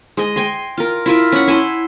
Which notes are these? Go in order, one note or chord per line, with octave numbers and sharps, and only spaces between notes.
G#3 G#4 D#5
G5 G#5 C6
F4 A#4
E4 F4 A#4 E5
C#4 F#5
E4 G#5 A5 C6